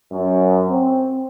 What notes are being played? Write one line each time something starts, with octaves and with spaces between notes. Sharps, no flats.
F#2
C4